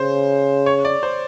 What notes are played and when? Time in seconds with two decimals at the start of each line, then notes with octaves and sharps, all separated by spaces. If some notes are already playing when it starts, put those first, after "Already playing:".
Already playing: C#3 C5
0.66 C#5
0.85 D5
1.03 C5